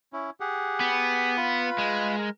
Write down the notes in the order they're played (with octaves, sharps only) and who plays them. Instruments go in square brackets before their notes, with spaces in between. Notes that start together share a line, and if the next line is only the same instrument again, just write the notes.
[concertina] C#4 E4
G4 G#4 F#5
[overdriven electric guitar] B3
[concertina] F4 B4 B5
[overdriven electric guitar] G#3
[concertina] A#4